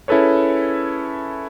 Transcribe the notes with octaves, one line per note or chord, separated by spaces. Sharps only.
C#4 E4 G#4 A4 B4 C#5